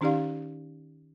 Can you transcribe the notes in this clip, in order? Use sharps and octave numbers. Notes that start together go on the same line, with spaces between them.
D#3 C#4 D#4 G4 D5 F5